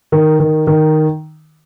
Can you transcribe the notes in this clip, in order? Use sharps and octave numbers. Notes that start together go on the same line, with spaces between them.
D#3
D#3
D#3